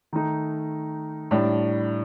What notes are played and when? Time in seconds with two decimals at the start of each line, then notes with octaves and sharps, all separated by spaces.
0.13 D#3 A3 D#4
1.31 A2 G3 D4